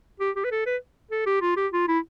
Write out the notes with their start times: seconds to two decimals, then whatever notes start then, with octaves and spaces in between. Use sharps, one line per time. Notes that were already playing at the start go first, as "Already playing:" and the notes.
0.20 G4
0.36 G4
0.44 B4
0.52 A4
0.66 B4
1.11 A4
1.26 G4
1.42 F4
1.57 G4
1.73 F4
1.88 E4